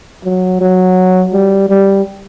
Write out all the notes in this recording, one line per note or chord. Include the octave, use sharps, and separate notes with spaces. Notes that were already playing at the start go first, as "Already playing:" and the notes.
F#3
F#3
G3
G3